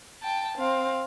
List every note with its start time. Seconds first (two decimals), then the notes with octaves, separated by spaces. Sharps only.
0.22 G5 A5
0.57 C4 F5